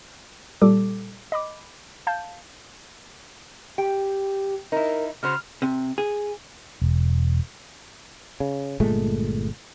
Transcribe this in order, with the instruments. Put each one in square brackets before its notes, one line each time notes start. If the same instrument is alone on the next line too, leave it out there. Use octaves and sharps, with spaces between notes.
[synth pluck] A#2 G3 A4 D6
D#5 B5 D6
F5 A5 G6
[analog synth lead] G4 [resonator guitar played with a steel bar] G5
[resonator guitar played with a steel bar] D#4 E4 [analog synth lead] A#4
[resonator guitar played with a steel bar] C#3 F#4 C5 [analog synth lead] F6
[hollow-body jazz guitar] C3
G#4
[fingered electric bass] E1
[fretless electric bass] C#3
G1 A#2 G#3 A3